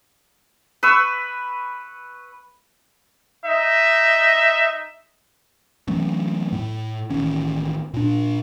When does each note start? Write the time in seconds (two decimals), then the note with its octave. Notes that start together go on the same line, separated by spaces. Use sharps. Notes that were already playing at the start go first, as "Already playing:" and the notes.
0.83 B4 C#6 E6
3.46 D#4 D#5 E5
5.88 E3 F#3 A3 C#4
6.52 A2
7.10 A1 A2 D#3 C#4
7.94 A#2 D4